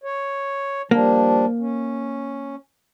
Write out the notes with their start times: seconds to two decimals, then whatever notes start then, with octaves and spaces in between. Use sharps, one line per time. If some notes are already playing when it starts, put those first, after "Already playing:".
0.04 C#5
0.91 F3 G3 A#3 D4
1.59 C#4